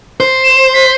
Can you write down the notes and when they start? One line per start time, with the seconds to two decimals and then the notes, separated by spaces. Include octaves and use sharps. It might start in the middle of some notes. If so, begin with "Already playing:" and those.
0.20 C5
0.44 E7
0.74 B6